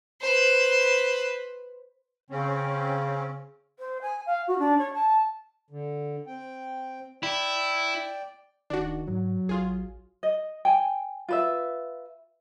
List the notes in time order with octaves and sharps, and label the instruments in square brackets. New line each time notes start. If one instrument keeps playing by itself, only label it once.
[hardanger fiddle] B4 C5
[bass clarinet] C#3 [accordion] C4 C#4
[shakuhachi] C5
G#5
F5
F#4
D4
C#5
A5
[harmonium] D3
C4 G5
[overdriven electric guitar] E4 [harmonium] D5 G5
[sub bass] D1 [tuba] D#3 [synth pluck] D4 F#4
[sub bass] G#2 [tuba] F#3
[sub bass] A1 [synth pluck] F4 G#4
[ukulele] D#5
G5 G#5
F4 B4 E5